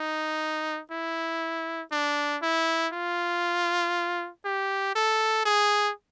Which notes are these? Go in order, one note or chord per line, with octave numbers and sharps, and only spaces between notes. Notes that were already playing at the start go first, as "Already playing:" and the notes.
Already playing: D#4
E4
D4
E4
F4
G4
A4
G#4